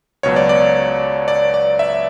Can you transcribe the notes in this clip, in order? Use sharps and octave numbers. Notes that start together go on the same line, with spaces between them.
C#2 B2 F#3 C#5
D5
D5
D5
D5
E5